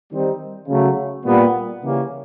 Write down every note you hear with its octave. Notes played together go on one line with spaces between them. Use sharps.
D#3 G3 C4 D#4
C#3 F#3 A3
A#2 G3 B3
C#3 E3 G3 A#3 C#4